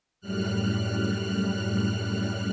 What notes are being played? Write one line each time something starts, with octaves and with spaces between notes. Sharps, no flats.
F#2 A2 G3 F6 F#6